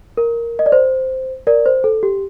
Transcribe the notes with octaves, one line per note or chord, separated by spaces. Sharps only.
A#4
D#5
D5
C5
A#4 D5
C5
A4
G4